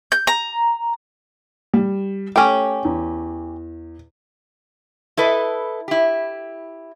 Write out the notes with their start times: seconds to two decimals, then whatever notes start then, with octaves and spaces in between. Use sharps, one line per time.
0.12 G6
0.27 A#5
1.74 G3
2.36 A3 C#4 G4
2.85 E2
5.17 E4 A4 B4 D#5
5.88 E4 G4